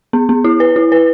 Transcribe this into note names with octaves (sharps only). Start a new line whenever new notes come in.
B3
B3
E4
B4
E4
B4